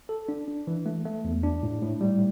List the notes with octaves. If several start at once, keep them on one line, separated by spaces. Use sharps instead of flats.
A4
D4
D4
E3
A3
A3
E2
D4
A2
A2
G3